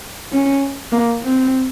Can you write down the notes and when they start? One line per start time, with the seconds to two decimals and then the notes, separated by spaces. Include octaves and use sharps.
0.33 C#4
0.92 A#3
1.22 C4